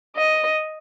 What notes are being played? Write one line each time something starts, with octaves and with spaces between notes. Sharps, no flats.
D#5